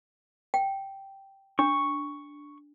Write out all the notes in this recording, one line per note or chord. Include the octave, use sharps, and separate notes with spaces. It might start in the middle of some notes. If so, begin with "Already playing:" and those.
G5
D4 C#6